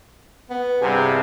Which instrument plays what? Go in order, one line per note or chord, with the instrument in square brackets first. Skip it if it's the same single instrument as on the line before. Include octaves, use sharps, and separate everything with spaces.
[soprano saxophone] B3
[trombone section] C2 G2 C3 [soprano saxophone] G#4